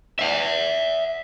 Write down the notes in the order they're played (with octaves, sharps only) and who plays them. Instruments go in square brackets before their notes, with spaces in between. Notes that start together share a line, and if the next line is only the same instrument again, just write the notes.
[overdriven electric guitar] E5 F#5